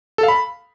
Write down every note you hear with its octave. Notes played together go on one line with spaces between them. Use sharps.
A4
F5
B5